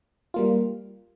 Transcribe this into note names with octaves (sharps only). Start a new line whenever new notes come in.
G3 A#3 F4